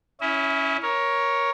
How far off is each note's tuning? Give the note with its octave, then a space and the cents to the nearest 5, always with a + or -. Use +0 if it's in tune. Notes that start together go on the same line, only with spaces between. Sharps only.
C#4 +10 E4 -5 E5 -45
A#4 +15 C#5 +0